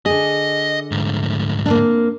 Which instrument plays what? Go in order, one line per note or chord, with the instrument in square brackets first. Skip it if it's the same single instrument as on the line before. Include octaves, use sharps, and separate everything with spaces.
[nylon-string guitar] D3 G#4 [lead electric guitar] D#5
[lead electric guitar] D2 G#2
[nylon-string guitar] A#3 C4 D4